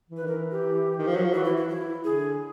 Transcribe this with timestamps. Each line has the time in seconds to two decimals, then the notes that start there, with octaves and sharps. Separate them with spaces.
0.10 E3
0.17 B4
0.23 D#3
0.27 E3 A#4
0.51 G4
0.98 D#3
1.07 F3
1.16 F#3
1.25 F3
1.34 E3 F#4
1.45 E4
1.57 E4
1.69 E4
2.04 D3 G#4